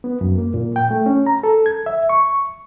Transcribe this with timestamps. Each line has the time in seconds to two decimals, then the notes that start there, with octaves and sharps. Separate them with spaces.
0.04 B3
0.21 F#2
0.38 A#3
0.54 A#2
0.76 G5
0.91 A3
1.06 C#4
1.27 A#5
1.43 A4
1.66 G#6
1.86 E5
2.09 C#6